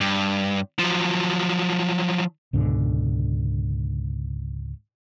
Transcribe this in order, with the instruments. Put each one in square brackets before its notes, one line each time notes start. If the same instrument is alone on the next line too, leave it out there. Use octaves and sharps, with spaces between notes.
[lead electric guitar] G2
F3 F#3
[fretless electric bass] C#2 G#2 B2 D3